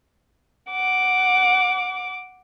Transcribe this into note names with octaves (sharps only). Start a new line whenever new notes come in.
F#5 D6